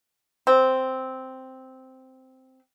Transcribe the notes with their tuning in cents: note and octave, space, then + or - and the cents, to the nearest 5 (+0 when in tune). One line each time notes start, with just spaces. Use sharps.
C4 -5